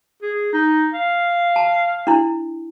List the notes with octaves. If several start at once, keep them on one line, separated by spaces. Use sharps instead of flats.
G#4
D#4
F5
A5
D4 E4